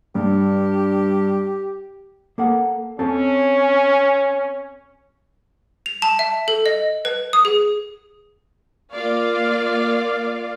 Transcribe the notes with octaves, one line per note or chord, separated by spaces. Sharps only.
G2 G4
A#3 A4 F#5
C4 C#4 A4 A5
F7
A5
E5
A4
D#5
B4
D#6
G#4
A#3 F4 D5 F5